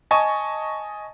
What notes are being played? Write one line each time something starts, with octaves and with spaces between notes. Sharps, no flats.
D#5 G#5 A5 C#6